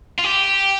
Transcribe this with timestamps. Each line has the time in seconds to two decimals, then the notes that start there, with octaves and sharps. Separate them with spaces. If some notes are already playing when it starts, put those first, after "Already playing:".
0.18 F4
0.24 G4